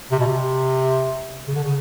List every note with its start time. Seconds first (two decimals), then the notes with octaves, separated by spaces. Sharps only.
0.12 C3
0.20 B2
0.27 C3
1.48 C#3
1.56 D3
1.64 C#3